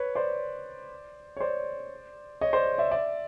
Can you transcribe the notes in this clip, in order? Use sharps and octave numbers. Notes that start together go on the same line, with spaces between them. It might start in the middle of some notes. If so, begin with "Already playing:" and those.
Already playing: B4 C#5
C5 D5
C#5
C5 D5
C#5 D#5
C5 D5
D5 E5
D5 E5